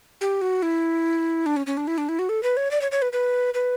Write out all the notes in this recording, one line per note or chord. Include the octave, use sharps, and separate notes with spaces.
G4
F#4
E4
D4
C#4
C#4
D4
E4
D4
E4
F#4
A4
B4
C#5
D5
C#5
C#5
B4
B4
B4